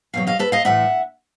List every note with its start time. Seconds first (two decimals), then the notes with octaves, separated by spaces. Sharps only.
0.14 E2 B2 F#3 F5
0.27 D#5 F5
0.39 A4 B4
0.52 D#5 F5
0.65 A2 E3 A3 E5 F#5